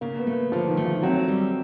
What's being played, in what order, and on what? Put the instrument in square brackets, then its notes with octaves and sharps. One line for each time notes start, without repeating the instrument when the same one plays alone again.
[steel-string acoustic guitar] C#3 [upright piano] A#3
[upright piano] B3
[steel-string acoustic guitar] A3
[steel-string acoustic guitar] D3 [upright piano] F3
[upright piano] D#3
[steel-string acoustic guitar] A3
[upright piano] F3
[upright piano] F#3 [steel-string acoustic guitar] C4
[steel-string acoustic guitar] G3